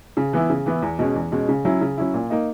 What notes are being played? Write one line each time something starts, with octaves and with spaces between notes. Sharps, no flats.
C#3
E3 B3 E4
C#3
E3 B3 E4
E2
B2 G#3 C#4
E2
B2 G#3 C#4
C#3
F#3 C#4 E4
C#3
F#3 C#4 E4
A#2
A#3 D#4